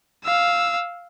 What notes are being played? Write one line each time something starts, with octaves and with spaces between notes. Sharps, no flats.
F5 E6